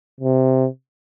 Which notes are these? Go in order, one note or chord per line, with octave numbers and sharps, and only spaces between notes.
C3